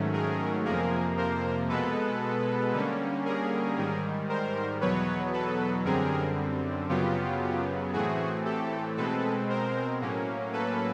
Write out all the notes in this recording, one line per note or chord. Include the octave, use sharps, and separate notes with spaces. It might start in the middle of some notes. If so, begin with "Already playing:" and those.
Already playing: G#2 D#3 F#3 A3 C#4
G#4 A#4
F2 C3 F3 A#3 G#4 A#4
A#4 C5
B2 G#3 B3 A4 B4
D3 G3 A#3 C#4
G#4 A#4
G#2 D#3 G3
A#4 C5
E2 B2 F#3 B3 B4 C#5
A4 B4
F#2 D3 G3 C4 G#4 A#4
F#2 C#3 F#3 B3 F4 G4
A2 E3 A3 C4 F#4 G#4
G4 A4
B2 G#3 C4 A4 B4
A#4 C5
A2 F#3 A#3 C#4
A4 B4